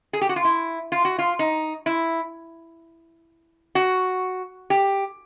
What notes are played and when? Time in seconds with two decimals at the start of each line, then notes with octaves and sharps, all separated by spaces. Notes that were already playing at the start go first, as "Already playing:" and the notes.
0.13 G#4
0.21 G4
0.29 F#4
0.36 F4
0.44 E4
0.92 F4
1.05 F#4
1.19 F4
1.39 D#4
1.86 E4
3.75 F#4
4.70 G4